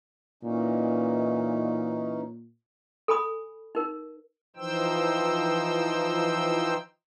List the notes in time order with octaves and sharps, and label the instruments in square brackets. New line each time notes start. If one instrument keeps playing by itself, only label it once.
[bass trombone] A#2 [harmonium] E3 C#4 D#4
[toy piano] A4 G#5 B5 D#6
D#4 A#4
[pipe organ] E3 F3 D#4 C5 G5 E6